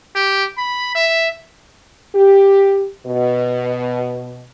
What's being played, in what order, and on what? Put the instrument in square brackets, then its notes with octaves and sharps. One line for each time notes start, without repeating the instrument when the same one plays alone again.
[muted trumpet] G4
B5
E5
[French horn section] G4
B2